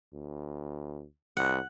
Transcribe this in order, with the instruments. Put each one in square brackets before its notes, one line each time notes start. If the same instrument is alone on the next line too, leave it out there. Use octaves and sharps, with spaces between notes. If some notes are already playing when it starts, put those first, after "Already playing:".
[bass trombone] D2
[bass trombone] C2 [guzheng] F#5